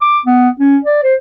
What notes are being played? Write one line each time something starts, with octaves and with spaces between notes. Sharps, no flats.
D6
B3
C#4
D5
C5